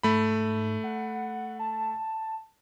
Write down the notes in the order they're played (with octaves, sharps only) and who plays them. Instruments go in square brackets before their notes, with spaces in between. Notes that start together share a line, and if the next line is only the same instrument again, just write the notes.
[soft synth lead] G#2 [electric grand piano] A3 B5
[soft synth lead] F#5
A5